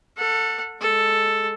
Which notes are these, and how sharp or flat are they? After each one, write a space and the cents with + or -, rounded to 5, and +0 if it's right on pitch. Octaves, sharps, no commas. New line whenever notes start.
A4 +20 F#5 -20
G#3 +0 A4 +0